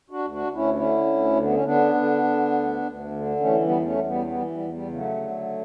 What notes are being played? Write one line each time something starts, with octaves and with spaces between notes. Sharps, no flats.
D4 F#4
D2
D4 F#4
D2
C#4 E4
D3 C#4 E4
D2
D3
B3
C#4
D3 B3 D4
D3
D3
D2
D2
D3
E3 A3 C#4
G3 B3
E2
A3 C#4
E2
G3 B3
E3 G3 B3
G3
E2
G3
C#3
F#3 A3
D3